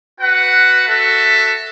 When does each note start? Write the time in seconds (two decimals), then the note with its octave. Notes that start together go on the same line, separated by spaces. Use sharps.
0.20 F#4 B4 F#5
0.88 F#4 A4 E5